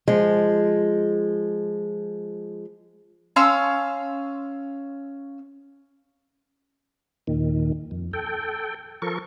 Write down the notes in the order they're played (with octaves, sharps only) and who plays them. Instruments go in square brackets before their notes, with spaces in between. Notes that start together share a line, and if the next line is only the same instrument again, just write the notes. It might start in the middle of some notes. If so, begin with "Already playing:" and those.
[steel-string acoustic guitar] F3 G#3
[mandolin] C#4 F5 C6 E6
[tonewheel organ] D#2 A#2 D#3
F2
A4 G5
F3 A4 A#4 C#6